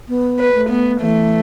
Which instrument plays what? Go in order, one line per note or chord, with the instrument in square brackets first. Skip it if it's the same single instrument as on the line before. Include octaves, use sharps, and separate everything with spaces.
[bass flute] B3
[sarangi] B4
[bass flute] A3
[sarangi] B3
[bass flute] E3 [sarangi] A3